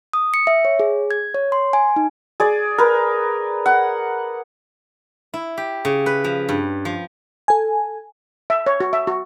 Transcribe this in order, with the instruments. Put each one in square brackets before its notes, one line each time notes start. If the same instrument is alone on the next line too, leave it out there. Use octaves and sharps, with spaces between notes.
[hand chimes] D#6
C#7
E5
C#5
G#4
G#6
C#5
C6
G#5
D#4
[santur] G#4 D5
A#4 B4
F#5
[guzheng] E4
G4
C#3
B4
F3
G2
F3
[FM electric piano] A4 G#5
[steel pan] E5
C#5
F#4
E5
F#4